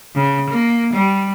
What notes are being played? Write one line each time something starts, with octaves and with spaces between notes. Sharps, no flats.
C#3
A#3
G3